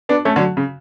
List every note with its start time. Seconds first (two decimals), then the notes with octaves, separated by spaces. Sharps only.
0.09 B3 D4
0.25 A3 C#4
0.36 D3 F#3
0.57 C#3